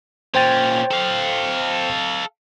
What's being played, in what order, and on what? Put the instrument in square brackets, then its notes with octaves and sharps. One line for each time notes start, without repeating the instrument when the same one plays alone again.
[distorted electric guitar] A#2 C#4 [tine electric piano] C5 G5 A6
[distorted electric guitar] A4 F5